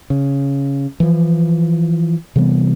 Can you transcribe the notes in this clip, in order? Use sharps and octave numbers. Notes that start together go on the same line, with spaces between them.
C#3
E3 F3
C3 E3 G3 B3